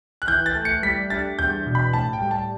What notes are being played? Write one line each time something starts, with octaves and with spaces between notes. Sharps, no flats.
F#6
E3 G6
A6
A3
C#7
G3 B6
D4 A6
E2 G6
B2
B5
A2 A5
G5
G3
A5